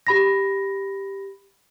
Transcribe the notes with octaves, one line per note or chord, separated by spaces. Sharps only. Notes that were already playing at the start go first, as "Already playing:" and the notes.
G4 B5 A#6